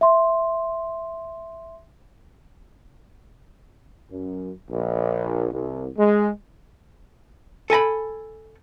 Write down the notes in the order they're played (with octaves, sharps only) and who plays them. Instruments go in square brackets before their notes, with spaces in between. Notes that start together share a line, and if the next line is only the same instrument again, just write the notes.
[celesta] E5 C6
[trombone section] F#2
A#1
C2
G#3
[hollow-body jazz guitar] A4 G#5 A#5 B5